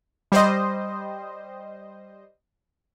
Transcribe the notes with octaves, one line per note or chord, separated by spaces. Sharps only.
G3 C5 D#5